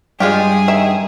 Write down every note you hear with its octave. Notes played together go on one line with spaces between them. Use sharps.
G2 G#3 F4 G4 G#4
D#3 E5